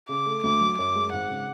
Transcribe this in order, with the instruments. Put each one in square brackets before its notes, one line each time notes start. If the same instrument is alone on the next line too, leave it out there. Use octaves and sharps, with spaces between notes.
[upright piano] C#3 [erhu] D6
[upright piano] A3
[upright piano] D2 [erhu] D6
[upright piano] F#3
[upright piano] F#2 [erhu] D6
[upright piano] G#3
[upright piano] G#1 [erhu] F#5
[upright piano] C#3